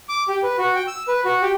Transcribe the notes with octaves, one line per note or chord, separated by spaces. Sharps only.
D6
G4
B4
F#4
G5
E6
B4
F#4
G4